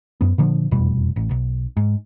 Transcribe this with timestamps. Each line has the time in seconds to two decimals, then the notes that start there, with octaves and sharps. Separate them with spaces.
0.21 F#2 B3
0.38 A#2 D3 F3
0.71 F1 E2 B2 G3
1.16 A1
1.31 B1
1.77 G#2